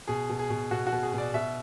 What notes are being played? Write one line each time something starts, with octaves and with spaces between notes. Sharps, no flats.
B2 G#4
B2
G#4
B2
B2 F#4
F#4
B2
G#4
B2 D5
B2 E5